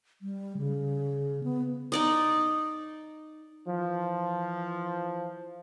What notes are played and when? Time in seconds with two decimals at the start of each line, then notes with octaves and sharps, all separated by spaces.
0.22 G3
0.58 C#3
1.44 B3
1.92 D#4 D5 D#5
3.66 E3 F3